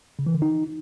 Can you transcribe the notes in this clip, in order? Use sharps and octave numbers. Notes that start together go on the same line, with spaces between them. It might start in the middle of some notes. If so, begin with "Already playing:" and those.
C#3
E3
D3
D#4